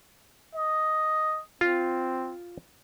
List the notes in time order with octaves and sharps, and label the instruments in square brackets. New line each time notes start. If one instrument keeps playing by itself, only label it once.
[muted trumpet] D#5
[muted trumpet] C4 [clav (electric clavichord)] F4